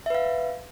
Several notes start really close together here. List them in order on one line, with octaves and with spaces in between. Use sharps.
E5 B4 F5